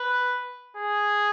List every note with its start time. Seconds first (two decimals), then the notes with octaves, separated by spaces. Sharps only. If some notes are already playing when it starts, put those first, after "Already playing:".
Already playing: B4
0.77 G#4